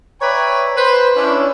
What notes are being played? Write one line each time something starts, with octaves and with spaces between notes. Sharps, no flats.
B4 C#5 D5 E5 G5 A#5
B4 C5
C#4 D4 E4